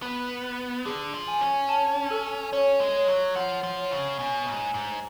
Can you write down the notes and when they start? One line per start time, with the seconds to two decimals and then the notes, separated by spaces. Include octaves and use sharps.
0.02 B3 F#6
0.44 F#6
0.85 D3 G#4
1.14 F3
1.28 G#5
1.41 C#4
1.69 A5
2.11 A4
2.53 C#4 C#5
2.80 G#3
2.94 C#5
3.08 F#3
3.36 F3 F#5
3.63 F3
3.77 C#5
3.91 C#3
4.19 B2 G#5
4.47 G#2
4.61 G#5
4.74 G#2